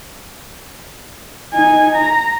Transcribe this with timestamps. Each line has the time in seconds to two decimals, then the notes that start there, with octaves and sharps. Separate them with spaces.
1.54 D#4 G#5
1.96 A#5